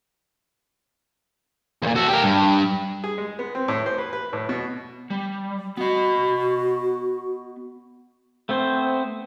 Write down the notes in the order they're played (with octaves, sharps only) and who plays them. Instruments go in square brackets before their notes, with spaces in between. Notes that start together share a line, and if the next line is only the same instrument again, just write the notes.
[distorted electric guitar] E2 A#2
F#4 A4
G4 A#4
G2
[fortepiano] G#4
G#3
B3
C4
A2
C5
B4
B4
A2
B2
[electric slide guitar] G3
[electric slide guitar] B3 D#5 [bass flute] F#4
[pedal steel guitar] A3 B3 C4 C5